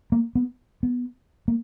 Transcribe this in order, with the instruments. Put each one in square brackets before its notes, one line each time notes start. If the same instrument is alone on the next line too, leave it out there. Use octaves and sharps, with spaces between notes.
[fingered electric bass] A#3
B3
B3
A#3